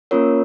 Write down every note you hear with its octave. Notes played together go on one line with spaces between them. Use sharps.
A#3 C#4 F4 A#4 C#5